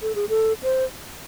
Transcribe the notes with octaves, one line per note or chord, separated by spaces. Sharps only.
A4
G#4
A4
C5